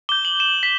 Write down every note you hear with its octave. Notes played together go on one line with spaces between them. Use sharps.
D6 G6 G7
F#7
E7
B6